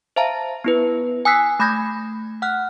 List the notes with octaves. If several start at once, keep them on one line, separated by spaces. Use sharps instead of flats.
C5 E5 F5 A5 A#5
B3 E4 B4
G#5 D#6 E6 F#6 B6 C7
A3 B5 D#6 G6 G#6 A#6
F#5 F6 F#6